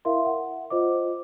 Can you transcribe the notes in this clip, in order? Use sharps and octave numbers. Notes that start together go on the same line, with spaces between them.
E4 A#4 E5 F5 C6
F#5
F4 C5 D#5 D6